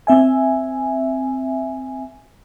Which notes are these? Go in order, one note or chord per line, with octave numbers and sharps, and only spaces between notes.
C4 E5 G#5